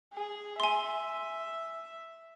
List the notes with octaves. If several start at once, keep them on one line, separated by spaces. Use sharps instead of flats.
G#4
E5 G#5 C6